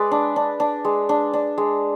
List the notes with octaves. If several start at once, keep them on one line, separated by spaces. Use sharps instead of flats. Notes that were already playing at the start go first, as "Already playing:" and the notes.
Already playing: G#3 B4 D5
D4
D4
D4
G#3
D4
D4
G#3